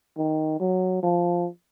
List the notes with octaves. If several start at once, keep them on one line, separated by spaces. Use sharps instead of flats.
D#3
F#3
F3